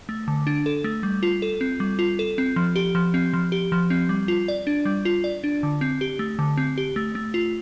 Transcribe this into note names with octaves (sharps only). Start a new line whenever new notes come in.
A3
D3
D4
A4
A3
G3
F4
A4
C4
G3
F4
A4
C4
F3
G4
F3
C4
F3
G4
F3
C4
G3
F4
D5
D4
G3
F4
D5
D4
D3
C4
G4
A3
D3
C4
G4
A3
A3
F4